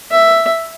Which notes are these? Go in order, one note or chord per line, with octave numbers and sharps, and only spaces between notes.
E5